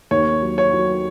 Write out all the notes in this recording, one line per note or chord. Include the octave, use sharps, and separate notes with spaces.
D#2 C#5
F#3
C#5
F#3